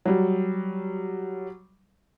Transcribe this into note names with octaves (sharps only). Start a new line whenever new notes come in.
F#3 G3